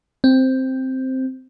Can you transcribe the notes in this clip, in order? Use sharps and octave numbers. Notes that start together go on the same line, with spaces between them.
C4